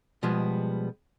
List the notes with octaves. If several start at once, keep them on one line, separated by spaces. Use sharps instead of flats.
B2 F3 G3 G#3 B3